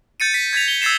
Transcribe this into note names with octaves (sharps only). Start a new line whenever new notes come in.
G6 A6 C#7 D#7
B6
G#6 A6 B6 F7
G7
E6 G#6 A6 C7 E7